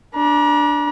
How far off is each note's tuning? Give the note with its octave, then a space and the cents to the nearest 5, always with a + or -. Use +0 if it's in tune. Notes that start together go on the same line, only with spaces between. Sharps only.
D4 +0 A#5 +45